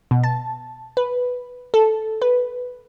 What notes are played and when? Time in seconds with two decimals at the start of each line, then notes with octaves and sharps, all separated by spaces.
0.11 B2
0.24 A5
0.97 B4
1.74 A4
2.22 B4